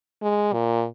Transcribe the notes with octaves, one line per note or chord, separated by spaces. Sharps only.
G#3
A#2